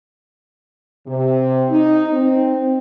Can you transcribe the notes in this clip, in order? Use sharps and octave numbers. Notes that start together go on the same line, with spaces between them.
C3
D#4
C4